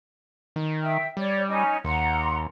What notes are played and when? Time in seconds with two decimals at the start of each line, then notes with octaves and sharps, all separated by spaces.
0.56 D#3
0.81 E5 G5
1.17 G3 C#5 D5 D6
1.48 C#4 D#4 G#5
1.85 D#2 F#5 A#5 C6